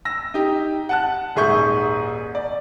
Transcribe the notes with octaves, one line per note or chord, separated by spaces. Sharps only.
E6 A#6
D#4 G4
F#5 A5 F#6
D#1 G#2 G#4 E5 C#6 G6
D5